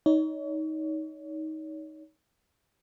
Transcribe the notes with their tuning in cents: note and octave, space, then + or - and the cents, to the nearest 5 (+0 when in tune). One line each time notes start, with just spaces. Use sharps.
D#4 +15 C#5 +35